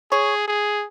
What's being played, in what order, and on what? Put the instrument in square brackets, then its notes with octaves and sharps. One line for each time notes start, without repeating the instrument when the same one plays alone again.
[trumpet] G#4 [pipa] C#5
[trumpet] G#4